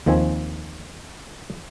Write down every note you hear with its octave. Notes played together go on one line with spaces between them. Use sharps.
D#2 D#3 F3 C4 G#5